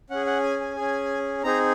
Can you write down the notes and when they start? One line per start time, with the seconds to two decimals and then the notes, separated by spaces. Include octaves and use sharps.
0.10 C#4 G#4 F#5
0.26 F#5
0.43 G#5
0.61 G#5
0.76 C#4 G#4
1.43 C4 D#4 G#4 A#5